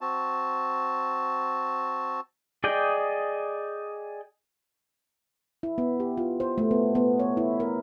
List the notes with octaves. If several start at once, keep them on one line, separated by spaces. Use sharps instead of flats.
C4 F#4 A5
G#4 D5 D#5 G5
E4
B3
G4
F4
C5
A3
B3
B3
C#5
E4
A#4